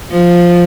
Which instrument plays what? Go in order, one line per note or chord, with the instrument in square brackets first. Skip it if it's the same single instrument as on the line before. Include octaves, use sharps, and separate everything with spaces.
[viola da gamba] F3